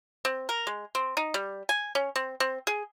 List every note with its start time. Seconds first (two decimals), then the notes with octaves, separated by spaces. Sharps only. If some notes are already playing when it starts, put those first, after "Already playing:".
0.25 C4
0.49 A#4
0.67 G#3
0.95 C4
1.17 D#4
1.34 G3
1.69 G#5
1.95 C#4
2.16 C4
2.40 C4
2.67 G#4